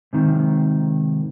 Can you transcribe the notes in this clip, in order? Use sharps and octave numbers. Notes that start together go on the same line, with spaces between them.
G#2 C3 D#3